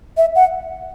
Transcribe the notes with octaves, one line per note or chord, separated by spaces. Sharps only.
E5
F#5